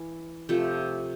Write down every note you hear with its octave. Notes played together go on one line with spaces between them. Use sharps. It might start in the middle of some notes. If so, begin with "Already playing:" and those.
Already playing: E3
C3 F3 A3